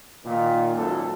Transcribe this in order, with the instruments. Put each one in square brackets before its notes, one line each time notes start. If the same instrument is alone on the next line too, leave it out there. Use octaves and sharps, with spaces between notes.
[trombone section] A#2 D#3
G#1 F#2 A#2 A4